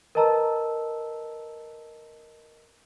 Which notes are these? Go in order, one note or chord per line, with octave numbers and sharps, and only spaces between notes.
A#4 B4 D#5 A5 A#5 E6